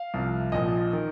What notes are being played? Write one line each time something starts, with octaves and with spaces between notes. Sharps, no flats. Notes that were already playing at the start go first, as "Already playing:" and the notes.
Already playing: F5
C2 C3 F3
A#1 A#2 F3 D#5
D#3